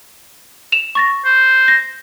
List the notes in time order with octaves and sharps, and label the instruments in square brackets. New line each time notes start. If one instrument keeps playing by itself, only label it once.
[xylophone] E7 F7
C#6 A6 A#6
[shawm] C5
[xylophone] A#6